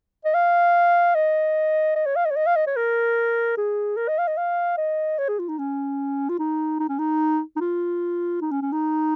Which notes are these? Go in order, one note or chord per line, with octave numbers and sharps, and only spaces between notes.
D#5
F5
D#5
D#5
C#5
F5
D#5
C#5
D#5
F5
D#5
C#5
A#4
G#4
A#4
D#5
F5
D#5
F5
D#5
C#5
G#4
F4
D#4
C#4
F4
D#4
D#4
C#4
D#4
D#4
F4
D#4
C#4
C#4
D#4